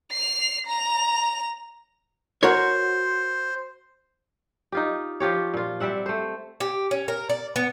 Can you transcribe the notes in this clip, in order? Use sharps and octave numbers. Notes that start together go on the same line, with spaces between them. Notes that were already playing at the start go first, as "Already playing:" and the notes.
C7 F7
A#5 F7
F#4 A#4 C5 C#5
D#4 F4 G4
F3 F4 G4 C#5
A#2 F4
G3 C4 E5 F#5
A3 C5
G4
C#4
A#4
D5
B3